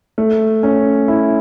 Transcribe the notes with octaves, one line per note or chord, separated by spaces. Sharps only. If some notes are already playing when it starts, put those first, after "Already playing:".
A3
C#4
E4